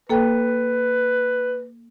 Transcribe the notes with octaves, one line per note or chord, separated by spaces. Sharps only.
A#3 A4 B4 G5